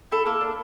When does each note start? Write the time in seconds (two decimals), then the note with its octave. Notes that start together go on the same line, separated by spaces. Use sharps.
0.11 E4 A4
0.26 A#3 A4
0.41 D4